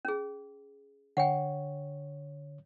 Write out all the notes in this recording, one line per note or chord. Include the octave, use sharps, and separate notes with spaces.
C#4 G#4
D3 C#5 F#5 G5